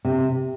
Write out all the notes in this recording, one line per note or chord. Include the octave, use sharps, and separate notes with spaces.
C3